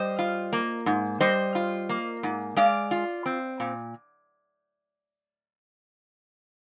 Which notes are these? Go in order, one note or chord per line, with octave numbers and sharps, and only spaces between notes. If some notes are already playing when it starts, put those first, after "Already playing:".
Already playing: G3 C5 D#5
F4
A#3
G#2
G3 C5 D#5
F4
A#3
G#2
G#3 D5 F5
F4
C4
A#2